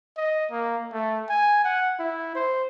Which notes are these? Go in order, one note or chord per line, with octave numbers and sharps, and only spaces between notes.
D#5
A#3
A3
G#5
F#5
E4
C5